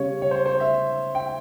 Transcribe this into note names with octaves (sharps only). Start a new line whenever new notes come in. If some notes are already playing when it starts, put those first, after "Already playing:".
Already playing: C#3 G3 C#5
C#5
C5
C5
E5
G5